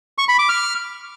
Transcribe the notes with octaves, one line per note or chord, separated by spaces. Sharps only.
C#6
B5
D6
F6